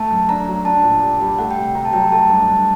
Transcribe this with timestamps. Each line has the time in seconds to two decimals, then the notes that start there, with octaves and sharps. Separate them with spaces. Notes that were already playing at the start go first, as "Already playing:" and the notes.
Already playing: A3 A5
0.11 F#2
0.29 D4 A#5
0.48 F#3
0.65 D4 A5
0.84 A#2
1.02 G4
1.21 G3
1.39 A3 F#5
1.51 G5
1.57 C3
1.63 G5
1.75 C3 A#5
1.85 A5
1.93 F#3 G5
2.03 A#5
2.12 A3 A5
2.29 G2
2.48 G2 A5